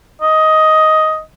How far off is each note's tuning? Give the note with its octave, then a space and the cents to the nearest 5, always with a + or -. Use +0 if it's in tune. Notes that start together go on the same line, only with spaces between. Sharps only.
D#5 +10